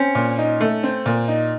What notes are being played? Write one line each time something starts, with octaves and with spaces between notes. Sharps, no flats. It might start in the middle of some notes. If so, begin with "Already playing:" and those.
Already playing: C4 C#4
A#2
D#4
A3
C4
A#2
D#4